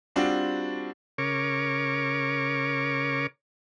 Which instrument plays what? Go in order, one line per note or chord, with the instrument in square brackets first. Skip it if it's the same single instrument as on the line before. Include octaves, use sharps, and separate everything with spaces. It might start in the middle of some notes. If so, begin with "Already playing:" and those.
[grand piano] G3 C4 D4 F4 F#4
[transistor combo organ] C#3 A#4 C#5 C#6 D6